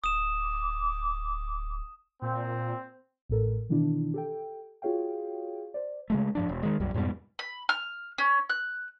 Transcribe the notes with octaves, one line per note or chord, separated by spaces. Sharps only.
D1 D6 D#6 E7
A#2 C4
A1 A2 A4 A#4
B2 D#3 E3 D4 E4
G4 A4 G5
F4 F#4 G#4 C#5 F5 G5
C5 D5
C#3 G#3 A3
G2 F3 D4
E1
D#3 G#3
C2 F#2 G3
F2 G#2 B2 G3
B5
F6
C#4
F#6